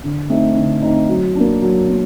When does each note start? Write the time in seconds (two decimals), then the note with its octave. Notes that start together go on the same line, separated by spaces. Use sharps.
0.04 D3
0.30 A3 C4 D#4
0.56 D3
0.82 A3 C4 D#4
1.08 F#3
1.36 A#3 D4
1.62 F#3
1.89 A#3